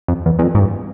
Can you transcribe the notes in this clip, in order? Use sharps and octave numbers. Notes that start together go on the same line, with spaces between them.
F2
E2
E2
F2
G#2
G2